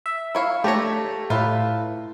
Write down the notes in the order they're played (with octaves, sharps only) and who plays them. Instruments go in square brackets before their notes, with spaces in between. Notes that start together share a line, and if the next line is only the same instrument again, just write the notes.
[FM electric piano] E5
[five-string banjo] E4 C#5 F5
[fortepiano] A3 [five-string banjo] D4 C#5 [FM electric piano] G4 A#5
[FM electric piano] A2 [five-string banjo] F4 B4 E5